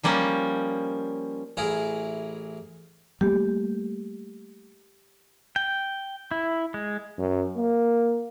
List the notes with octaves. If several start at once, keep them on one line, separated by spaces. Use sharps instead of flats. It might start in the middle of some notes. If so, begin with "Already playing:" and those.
F3 G3 A#3 C#4
A1 E4 G#4 A#4
G3 A3 A#3 G4
G5
E4
G#3
F#2
A#3